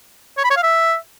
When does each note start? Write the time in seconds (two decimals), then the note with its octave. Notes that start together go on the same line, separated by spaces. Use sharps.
0.38 C#5
0.44 B5
0.50 C#5
0.57 F5
0.63 E5